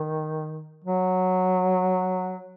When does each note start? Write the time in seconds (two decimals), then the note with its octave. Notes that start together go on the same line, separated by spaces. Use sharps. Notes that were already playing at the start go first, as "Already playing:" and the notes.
Already playing: D#3
0.84 F#3